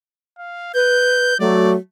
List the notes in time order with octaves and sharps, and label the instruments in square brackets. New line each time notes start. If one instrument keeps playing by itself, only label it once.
[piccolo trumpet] F5
[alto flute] B4 [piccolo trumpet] G6
[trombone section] F#3 [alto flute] A3 [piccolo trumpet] D5